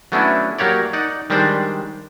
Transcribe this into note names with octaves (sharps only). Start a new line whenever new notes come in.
F#3 A3 B3 C#4 D4 E4
F#3 A#3 G4 C#5 D5
D#4 D5 F#5
D#3 G3 G#3 D4 C5 D5